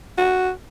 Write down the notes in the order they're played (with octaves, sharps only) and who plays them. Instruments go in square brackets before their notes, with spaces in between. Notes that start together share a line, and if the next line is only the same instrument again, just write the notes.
[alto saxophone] F#4